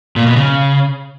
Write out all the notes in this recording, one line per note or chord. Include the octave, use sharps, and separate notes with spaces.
A#2
B2
C#3